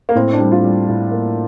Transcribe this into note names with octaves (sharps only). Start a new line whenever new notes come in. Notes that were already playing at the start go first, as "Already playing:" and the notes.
A#3
A2 C4
D4
G3
F4
G3
A2
A#3